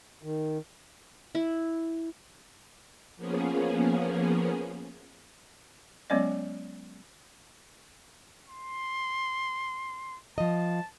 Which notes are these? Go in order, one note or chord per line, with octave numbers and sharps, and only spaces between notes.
D#3
E4
F3 A#3 B3 C#4 G#4
F#3 G#3 B3 C#4 D5 D#5
C6
F3 D#5 A5